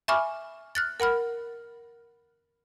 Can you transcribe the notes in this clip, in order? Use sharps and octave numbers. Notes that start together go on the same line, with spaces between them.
E5 G#5 B5 C#6 D6 F6
F6 F#6 A6
A#4 F#5 B5 F6